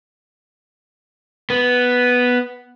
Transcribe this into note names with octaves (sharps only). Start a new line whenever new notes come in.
B3